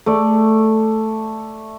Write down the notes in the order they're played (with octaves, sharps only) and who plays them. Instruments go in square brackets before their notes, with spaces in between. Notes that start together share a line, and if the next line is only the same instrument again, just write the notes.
[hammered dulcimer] A3 D5